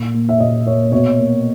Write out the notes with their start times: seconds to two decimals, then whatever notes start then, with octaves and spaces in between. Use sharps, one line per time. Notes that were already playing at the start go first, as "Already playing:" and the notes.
Already playing: A#2
0.14 A#3
0.29 E5
0.40 A#2 D#5
0.66 A#3 C#5
0.92 B2 C#5
1.19 A#3